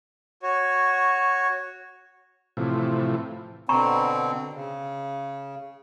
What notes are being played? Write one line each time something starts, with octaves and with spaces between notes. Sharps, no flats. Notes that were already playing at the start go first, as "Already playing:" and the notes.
F#4 C#5
A2 C3 E3 F3
B2 D3 C4 A#5 B5 C#6
C#3